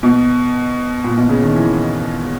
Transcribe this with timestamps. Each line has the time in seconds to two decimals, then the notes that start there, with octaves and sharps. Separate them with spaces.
0.03 B2
1.04 A#2
1.17 B2
1.29 C#3
1.42 D#3
1.55 E3